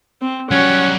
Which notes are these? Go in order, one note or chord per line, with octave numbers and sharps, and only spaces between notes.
C4
F#3 G3 C#4 F#5 C#6